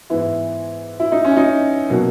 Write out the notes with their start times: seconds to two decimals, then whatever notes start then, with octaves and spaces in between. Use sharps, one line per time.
0.10 G#2 E3 B3 E4
1.00 E4
1.12 D#4
1.24 C#4
1.37 D#4
1.90 B2 F#3 A#3